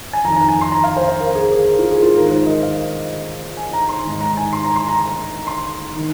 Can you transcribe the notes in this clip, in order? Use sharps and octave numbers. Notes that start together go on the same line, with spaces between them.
G#5
F2 D#3 A#5
A#5
G#5
C6
A#5
F5
C5
F5
A#4
G#4
G#4
A#4
F4
G#4
F4
G#2 D#3 A#4
C5
D#5
F5
G#5
A#5
C6
G#2 D#3
A#5
G#5
C6
A#5
C6
A#5
C6
D#3